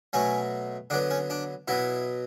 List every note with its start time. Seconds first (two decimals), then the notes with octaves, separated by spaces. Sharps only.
0.13 B2 F#3 A3 C#4
0.90 D3 F#3 B3 D4
1.10 C#4
1.30 D4
1.68 B2 F#3 B3 E4